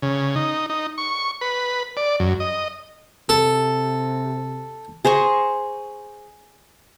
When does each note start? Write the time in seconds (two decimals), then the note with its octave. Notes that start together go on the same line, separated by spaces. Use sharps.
0.02 C#3
0.36 D#4
0.70 D#4
0.98 C#6
1.41 B4
1.97 D5
2.20 F#2
2.40 D#5
3.29 C3 A4
5.05 G#4 C5 A#5 C#6